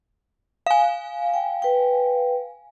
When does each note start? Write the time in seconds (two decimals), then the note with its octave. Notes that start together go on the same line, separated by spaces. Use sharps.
0.66 F5 G#5
1.34 G5
1.62 B4 G5